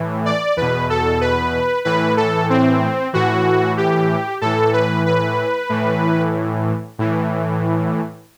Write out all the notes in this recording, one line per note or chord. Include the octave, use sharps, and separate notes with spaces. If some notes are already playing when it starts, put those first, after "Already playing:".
Already playing: A2 E3
D5
E2 B2 B4
A4
B4
A2 E3 B4
A4
C4
A2 E3 F#4
G4
A2 E3 A4
B4
B4
A2 E3
A2 E3